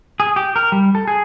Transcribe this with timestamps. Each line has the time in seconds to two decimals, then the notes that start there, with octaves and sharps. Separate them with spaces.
0.20 G#4
0.36 G4
0.56 A#4
0.72 G3
0.95 A4
1.07 G#4